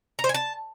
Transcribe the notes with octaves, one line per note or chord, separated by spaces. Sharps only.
A#5
C5
G#5
A5